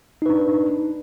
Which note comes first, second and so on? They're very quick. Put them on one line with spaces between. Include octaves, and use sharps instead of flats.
D#4 B4 D4